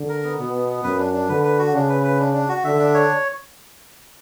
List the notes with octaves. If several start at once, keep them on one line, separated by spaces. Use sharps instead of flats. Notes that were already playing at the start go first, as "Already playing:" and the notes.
Already playing: D3
A#4
B3
B2 B3
B3
B3
F#2 B4
D4
D4
D3 B4
B4
F#4
C#3 D4
B4
B4
D4
D4
F#4
D3 E5
D4
C#5